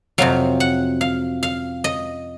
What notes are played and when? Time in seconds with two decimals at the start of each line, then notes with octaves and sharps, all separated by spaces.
0.18 F2 C3 F#3 F5
0.60 F#5
1.01 F5
1.43 F5
1.84 D#5